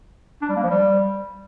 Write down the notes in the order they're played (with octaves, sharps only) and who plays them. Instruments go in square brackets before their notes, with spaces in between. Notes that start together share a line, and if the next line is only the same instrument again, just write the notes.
[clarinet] D4
G3
A#3
F3
G3